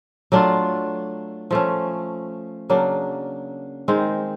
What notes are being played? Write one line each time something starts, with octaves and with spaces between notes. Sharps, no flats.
F#3 A3 D4 F4
F3 A3 C#4
C#3 F#3 A#3 D4
D#3 G#3 C4